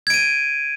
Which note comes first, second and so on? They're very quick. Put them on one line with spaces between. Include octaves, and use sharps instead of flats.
G#6 D7 D#7